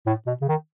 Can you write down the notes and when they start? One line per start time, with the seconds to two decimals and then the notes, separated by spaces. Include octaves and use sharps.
0.06 A2
0.26 B2
0.41 C#3
0.48 D#3